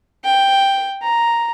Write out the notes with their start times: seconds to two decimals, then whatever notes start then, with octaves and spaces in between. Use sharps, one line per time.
0.24 G5
1.02 A#5